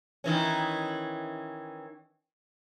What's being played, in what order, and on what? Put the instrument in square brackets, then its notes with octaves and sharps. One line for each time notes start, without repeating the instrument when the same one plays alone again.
[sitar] D#3 E3 C#4